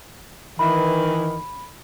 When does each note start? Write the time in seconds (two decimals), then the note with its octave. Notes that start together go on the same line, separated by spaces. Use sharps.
0.59 D#3 E3 B5